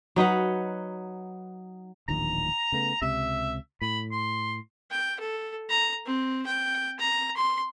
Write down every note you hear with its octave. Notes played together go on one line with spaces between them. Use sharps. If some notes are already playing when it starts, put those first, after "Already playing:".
F#3 D#4 B4 F#5
D1 A#1 D#3 A#5
C#3 A3 B3
C#2 C3 E5
A2 B5
C6
G5
A4
A#5
C4
G5
A#5
C6